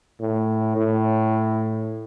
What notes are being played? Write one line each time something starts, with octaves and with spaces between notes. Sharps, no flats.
A2
A2